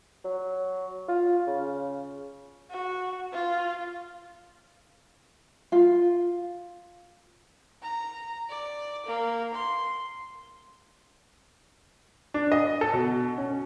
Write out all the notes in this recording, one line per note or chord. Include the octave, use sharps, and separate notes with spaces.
F#3
F4
C#3
F#4
F4
F4
A#5
D5
A#3
C6
D4
D#5
A4
B2
C#4